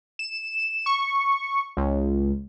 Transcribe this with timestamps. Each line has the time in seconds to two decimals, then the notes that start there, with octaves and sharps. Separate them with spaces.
0.19 E7
0.86 C#6
1.77 C#2